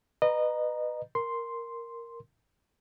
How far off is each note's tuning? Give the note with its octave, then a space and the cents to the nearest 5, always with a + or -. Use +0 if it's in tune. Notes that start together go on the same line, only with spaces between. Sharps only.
B4 +5 D#5 -25 A#5 +10
A#4 +0 C6 +0